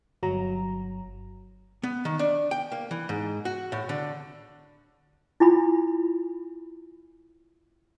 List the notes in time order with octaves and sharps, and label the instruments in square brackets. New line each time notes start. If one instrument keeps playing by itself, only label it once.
[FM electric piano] G1 F#3 A#5
[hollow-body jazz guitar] B3
D#3
D4
G5
A#3
E3
G#2
F#4
A2
D3
[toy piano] E4 F4 G#5 B5